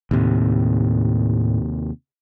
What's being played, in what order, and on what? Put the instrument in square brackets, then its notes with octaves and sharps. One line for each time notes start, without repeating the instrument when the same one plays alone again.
[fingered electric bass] D#2 C3 [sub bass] A2